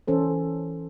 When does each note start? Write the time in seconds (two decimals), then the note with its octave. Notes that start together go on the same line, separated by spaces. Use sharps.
0.08 E3 C#4 A4 C5